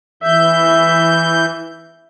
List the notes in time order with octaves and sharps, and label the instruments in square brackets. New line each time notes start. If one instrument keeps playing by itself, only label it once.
[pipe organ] E3 G6 [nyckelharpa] E5